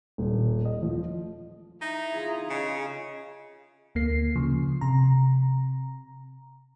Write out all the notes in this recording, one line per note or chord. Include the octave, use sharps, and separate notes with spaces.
D#1
D#5
F3
D#4 E4 A#5
F4 G#4
C#3 D#5
D2 A#3 C7
C#3 F3
C3 A#5